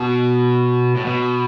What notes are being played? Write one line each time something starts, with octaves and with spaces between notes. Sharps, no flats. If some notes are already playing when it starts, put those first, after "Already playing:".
Already playing: B2
A2
B2